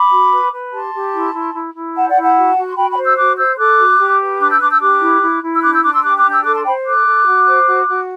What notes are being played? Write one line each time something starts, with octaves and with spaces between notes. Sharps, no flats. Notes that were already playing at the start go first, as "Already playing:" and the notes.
Already playing: B5 D6
F#4
B4
B4
G4 A5 C6
G4
E4
E4
E4
E4
C5 F#5 A5
D5 F#5
E4
F#5 A5
F#4
F#4
C6
F#4 G5 B5
G5 B5
C5
E6 G6
F#4 D6 F#6
C5 E6 G6
A4 D6 F#6
F#4
G4
B4
D4 D6 F#6
E6 G6
D4 D6 F#6
E6 G6
G4 D6 F#6
E4
E4
E4
E6
D4 D6 F#6
E6 G6
D4 D6 F#6
C6 E6
G4 D6 F#6
D6 F#6
D4
E6 G6
A4 D6 F#6
A5 C6
C5 G5 B5
A4 D6 F#6
A4
F#4
C5
F#4
F#4